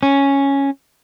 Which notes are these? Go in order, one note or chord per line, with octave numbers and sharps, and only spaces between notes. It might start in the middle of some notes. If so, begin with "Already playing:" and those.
C#4